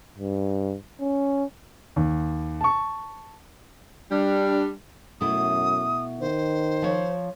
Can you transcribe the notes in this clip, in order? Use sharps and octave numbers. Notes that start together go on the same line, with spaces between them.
G2
C#4
D#2
A5 C#6
G3 D4
F#2 B2 A3 E4 D#6
D#3 C5
F3 C#5